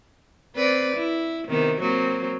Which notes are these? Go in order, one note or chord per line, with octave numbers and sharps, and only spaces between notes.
C4 B4 D5
E4
C3 D#3 B3
F#3 A#3 C4